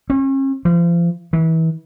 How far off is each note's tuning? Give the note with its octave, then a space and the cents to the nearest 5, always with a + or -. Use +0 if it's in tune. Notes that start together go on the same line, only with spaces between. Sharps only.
C#4 -40
F3 -35
E3 -30